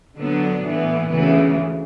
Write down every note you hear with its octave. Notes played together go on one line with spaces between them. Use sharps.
D3 F#3 B3 D4
A2 E3 B3
D2 C#3 E3 B3